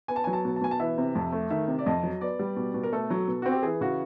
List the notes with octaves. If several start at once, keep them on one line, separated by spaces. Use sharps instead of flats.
B3 G#5
A5
F#3 G#5
A5
B2
A5
B2 G#5
A5
E3 E5
C3
F2
A3
D#3 E5
C3
D5
F2 D#5
F#3
B3 D5
G3
B2
B2
A#4
A3 A4
F#3
B2
C4 F#4
G4
E3 G#4
C#3 F#4